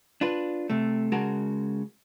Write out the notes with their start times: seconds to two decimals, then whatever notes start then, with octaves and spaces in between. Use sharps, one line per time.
0.21 D4 F4 B4
0.70 C3 A3
1.12 C#3 G#3 F#4 A#4 A5